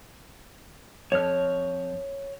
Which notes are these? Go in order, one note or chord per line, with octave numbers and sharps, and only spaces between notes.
F2 C#5 F6